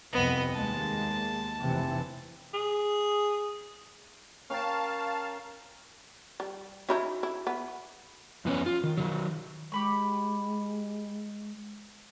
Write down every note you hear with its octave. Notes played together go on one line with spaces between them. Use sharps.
C2 F2 B3 D#5
D#2 G#3 A#3 A5
F1 C3 E3
G#4
C#4 A#4 F5 G5 A5
G3
C#4 D#4 E4 F#4 E5 B5
E4
B3
F2 F3 B3 C#4 C#5
F4
D#3
D#3 F#3
G#3 G4 B5 C#6